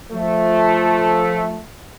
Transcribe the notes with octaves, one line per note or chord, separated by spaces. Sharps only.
F3 A3